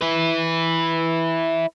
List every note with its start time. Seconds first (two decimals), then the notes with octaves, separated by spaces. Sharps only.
0.02 E4 B4